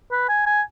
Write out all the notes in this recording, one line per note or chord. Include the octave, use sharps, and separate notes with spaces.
B4
G#5
G#5